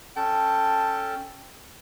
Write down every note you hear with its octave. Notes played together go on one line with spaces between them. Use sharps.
C#4 A4 G5 A5